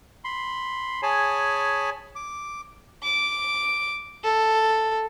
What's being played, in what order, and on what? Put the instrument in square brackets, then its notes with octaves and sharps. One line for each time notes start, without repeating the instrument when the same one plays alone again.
[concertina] B5 C6
G#4 C#5 G#5 A5 B5
D6
[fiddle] D6
A4